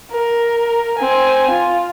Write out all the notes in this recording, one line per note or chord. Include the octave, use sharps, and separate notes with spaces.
A#4
C4 G#5
F4